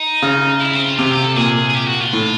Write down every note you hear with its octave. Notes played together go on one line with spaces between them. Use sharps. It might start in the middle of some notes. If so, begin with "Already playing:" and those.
Already playing: D#4
C#3
E4
C4
F4
C3 F4
G4
A4
A#2 G#4
G#4
G4
F#4
F4
A2